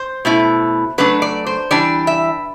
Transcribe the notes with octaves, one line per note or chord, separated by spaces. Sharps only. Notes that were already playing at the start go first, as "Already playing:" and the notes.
Already playing: C5
B2 A3 E4
F#3 A3 D4 B4
D5
C5
E3 G3 D4 D5
E5